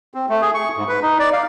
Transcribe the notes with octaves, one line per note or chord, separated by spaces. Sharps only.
C4
A3
G#4
C#6
G#2
B4
D#4
D5
F5